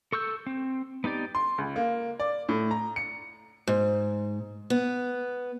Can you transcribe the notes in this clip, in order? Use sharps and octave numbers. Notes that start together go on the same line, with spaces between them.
A4 C#6 E6 G6
C4
B3 D#4 G4 D5
C6
C#2
A#3
D5
A2
A#5
C#7
G#2
B3